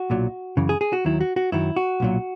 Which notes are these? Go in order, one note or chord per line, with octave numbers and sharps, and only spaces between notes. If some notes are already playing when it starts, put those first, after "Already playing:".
Already playing: F#4
B1 A#2 F#3
F#2 C#3 E3
G#4
G#4
F#4
D#2 D#3 F#3 E4
F#4
F#4
F#2 D#3 F#3 E4
F#4
B1 A#2 F#3